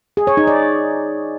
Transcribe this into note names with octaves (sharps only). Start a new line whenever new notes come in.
G#4
C#5
D#4
D5